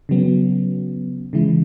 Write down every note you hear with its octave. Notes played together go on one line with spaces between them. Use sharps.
C#3 F#3 B3
C#3 E3 G#3 E4